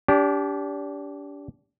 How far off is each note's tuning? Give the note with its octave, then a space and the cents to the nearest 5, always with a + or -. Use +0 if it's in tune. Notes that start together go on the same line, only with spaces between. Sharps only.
D4 -35 G4 +0